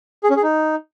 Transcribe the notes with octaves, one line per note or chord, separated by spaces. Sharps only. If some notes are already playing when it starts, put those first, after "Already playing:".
G#4
C#4
G#4
D#4